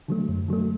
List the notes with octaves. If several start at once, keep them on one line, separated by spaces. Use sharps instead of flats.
D3 F#3 A3
F#2
D3 F#3 A3